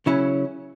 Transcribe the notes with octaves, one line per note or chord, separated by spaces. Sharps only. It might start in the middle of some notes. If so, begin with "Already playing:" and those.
C#3 F#3 C#4 E4